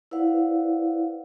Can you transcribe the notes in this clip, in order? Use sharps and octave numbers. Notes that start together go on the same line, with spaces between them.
E4 B4 C5 D5 F5 F#5